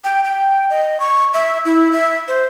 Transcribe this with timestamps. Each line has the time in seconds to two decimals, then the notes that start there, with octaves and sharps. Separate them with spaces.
0.04 G5
0.24 G5
0.70 D#5
1.00 C#6
1.34 E5
1.65 E4
1.92 E5
2.28 C5